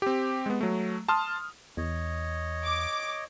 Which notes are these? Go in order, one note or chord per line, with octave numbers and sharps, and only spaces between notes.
C4 G4
G#3 B3
F#3 A3
A5 C6 D#6 F6
E2 C#5 D#5
D6